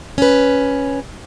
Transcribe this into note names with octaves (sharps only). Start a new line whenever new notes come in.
C#4 B4